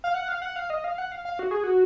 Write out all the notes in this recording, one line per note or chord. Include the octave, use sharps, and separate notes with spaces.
F5
F#5
F5
F#5
F5
D#5
F5
F#5
F5
F5
F#4
G#4
F#4